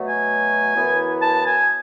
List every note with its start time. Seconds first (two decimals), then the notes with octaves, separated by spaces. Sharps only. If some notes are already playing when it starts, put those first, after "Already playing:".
Already playing: B2 F#3 A3
0.08 G#5
0.74 F#2 E3 B3 E4
1.22 A5
1.46 G#5